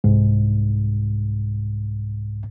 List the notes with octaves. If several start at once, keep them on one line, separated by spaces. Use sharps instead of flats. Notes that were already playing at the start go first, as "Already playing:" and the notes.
C2 G#2